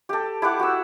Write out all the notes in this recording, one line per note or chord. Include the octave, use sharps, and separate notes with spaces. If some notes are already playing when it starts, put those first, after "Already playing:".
G4 A4
E4 G4 F#5 D6
F#4 E6